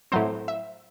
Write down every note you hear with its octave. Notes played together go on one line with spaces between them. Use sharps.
A2 F#3 C4 C5
E5